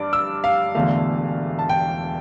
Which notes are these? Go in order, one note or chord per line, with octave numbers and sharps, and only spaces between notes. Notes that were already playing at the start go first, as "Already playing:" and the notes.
Already playing: G2 D4 D6
E6
F5
E1 E2 D3 A3 F5
A5
G5